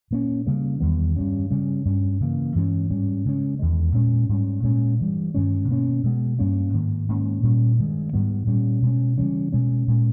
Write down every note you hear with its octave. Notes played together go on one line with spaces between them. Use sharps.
A#2 A#3 C#4
C#3 G3 A#3
E2 D#3 G3 B3
G2 G3 C#4
C#3 G3 C#4
G2 G3 C#4
C#3 E3 A#3
G2 E3 G#3 C#4
G#2 G3 C#4
C#3 G#3 C#4
E2 D#3 G#3
A#2 G#3 C#4
G#2 G3 C#4
A#2 G#3 C#4
G2 E3 G3
G2 D#3 G#3 C#4
B2 A#3 C#4
B2 G#3 B3
G2 G3 A#3 C#4
G#2 D#3 A#3
G#2 D#3 A#3 C#4
A#2 G3 C#4
G2 D#3 G#3
G#2 D#3 G3 B3
A#2 G3 C#4
B2 G#3 C#4
C#3 E3 G3 C#4
B2 G#3 C#4
A#2 G#3 C#4